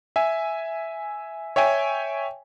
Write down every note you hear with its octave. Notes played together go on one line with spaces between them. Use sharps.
E5 G#5
C#5 E5 G5 G#5